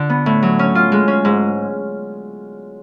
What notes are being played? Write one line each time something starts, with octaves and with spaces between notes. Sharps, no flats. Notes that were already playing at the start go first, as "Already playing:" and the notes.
Already playing: D3 F4
B3
A2
F#3
C#4
F4
G#3
C#4
G#2